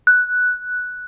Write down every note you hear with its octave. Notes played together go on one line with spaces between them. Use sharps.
F#6